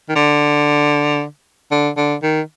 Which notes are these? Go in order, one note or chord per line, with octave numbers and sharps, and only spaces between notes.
D#3
D3
D3
D3
D#3